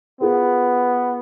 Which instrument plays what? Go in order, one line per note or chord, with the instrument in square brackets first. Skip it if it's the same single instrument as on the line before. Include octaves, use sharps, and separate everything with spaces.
[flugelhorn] B3 [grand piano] F4 G#4 A#4